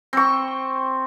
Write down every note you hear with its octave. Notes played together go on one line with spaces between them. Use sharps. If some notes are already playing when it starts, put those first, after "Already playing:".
C4 C#6